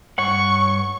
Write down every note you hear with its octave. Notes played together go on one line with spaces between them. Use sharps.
G2 C#5 F#5 C#6